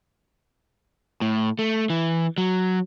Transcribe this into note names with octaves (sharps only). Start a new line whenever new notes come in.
A2
A3
E3
F#3